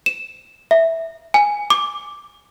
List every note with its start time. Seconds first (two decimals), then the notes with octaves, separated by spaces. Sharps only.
0.06 E7
0.71 E5
1.34 G#5
1.70 D6